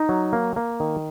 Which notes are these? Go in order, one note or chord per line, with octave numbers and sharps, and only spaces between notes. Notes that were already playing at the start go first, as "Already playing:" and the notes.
Already playing: D#4
F#3
A#3
A#3
D#3